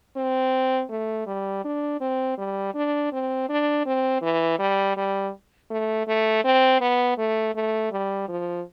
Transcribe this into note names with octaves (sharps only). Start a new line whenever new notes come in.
C4
A3
G3
D4
C4
G3
D4
C4
D4
C4
E3
G3
G3
A3
A3
C4
B3
A3
A3
G3
F3